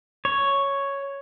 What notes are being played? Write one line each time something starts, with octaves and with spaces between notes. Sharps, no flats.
C#5